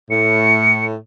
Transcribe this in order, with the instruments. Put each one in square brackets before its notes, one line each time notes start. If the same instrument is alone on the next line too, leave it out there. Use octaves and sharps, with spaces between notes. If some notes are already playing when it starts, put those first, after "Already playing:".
[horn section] A2 [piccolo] C#7